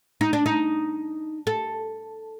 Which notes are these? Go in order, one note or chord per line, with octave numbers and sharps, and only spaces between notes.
D#4
D4
D#4
A4